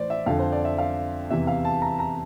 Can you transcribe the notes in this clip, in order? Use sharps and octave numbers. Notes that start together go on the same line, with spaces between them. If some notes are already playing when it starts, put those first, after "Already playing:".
Already playing: A2 E3 C5 D5
E5
F2 D3 F5
C5
D5
E5
F5
E2 C3 E3 E5
F5
A5
A#5
A#5